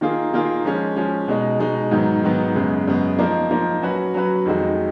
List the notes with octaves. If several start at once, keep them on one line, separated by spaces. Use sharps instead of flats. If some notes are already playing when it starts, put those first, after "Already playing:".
D#3 A#3 F4 G#4
D#3 A#3 F4 G#4
F3 G#3 C#4
F3 G#3 C#4
B2 G#3 D#4
B2 G#3 D#4
G#2 D#3 F#3 B3
G#2 D#3 F#3 B3
F#2 C#3 G#3 B3
F#2 C#3 G#3 B3
F3 A#3 D#4 A#4
F3 A#3 D#4 A#4
F#3 C#4 F#4 B4
F#3 C#4 F#4 B4
F2 D#3 G#3 D#4 F#4